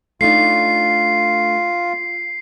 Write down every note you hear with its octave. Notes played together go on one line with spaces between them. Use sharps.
A3 D4 D#4 F4 C7